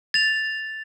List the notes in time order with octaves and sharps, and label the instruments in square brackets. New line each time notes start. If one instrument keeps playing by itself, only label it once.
[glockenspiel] A6 F7